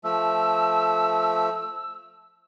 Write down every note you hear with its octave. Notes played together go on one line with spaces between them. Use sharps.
F3 A3 E6